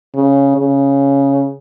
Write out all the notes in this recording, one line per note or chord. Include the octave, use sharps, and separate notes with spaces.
C#3
C#3